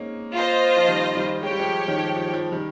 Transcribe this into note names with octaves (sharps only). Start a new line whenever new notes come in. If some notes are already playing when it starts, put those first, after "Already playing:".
Already playing: G#3 A#3 C4 C#4 D#4
F4 C5 D#5
F3
D#3 G3
D#3 G3
G#3 G4 C#5 G5
G3
F3 G#3
D#3
F3
F3
F3
D#3 G3